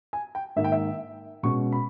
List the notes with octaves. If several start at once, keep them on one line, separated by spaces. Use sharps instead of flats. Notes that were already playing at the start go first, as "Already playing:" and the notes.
G#5
G5
G#2 D#3 A#3 E5
G5
E5
B2 G#3 C#4 C#6
B5